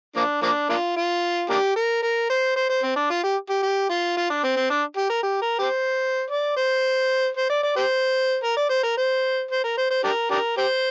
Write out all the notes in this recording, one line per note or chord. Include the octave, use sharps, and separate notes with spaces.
F3 A#3 D4
F3 A#3 D4
A#3 D4 F4
F4
A#3 D4 G4
A#4
A#4
C5
C5
C5
C4
D4
F4
G4
G4
G4
F4
F4
D4
C4
C4
D4
G4
A#4
G4
A#4
G4 C5
D5
C5
C5
D5
D5
G4 C5
A#4
D5
C5
A#4
C5
C5
A#4
C5
C5
D4 G4 A#4
D4 G4 A#4
G4 C5